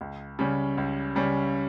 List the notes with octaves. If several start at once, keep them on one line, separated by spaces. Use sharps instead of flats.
C#2
C#3 G3 C#4
C#2
C#3 G3 C#4